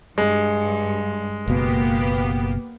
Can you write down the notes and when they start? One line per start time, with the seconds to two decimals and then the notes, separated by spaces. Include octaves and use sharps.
0.18 G2 G#3
1.48 F#1 B2 A#3 B3 G4